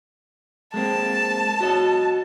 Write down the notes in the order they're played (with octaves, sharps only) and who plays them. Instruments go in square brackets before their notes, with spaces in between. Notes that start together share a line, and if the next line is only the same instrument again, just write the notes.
[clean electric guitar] G#3 A#3 C4 [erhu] A5
[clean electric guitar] F#4 C#5 D#5